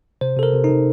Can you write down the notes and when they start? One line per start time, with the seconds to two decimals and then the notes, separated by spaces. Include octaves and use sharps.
0.21 C3 C5
0.37 C3 A4
0.43 A#4
0.54 C3
0.64 D#4
0.70 C3